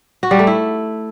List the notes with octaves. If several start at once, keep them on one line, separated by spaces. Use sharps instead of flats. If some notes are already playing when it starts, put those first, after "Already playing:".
F#4
G3
A3
E4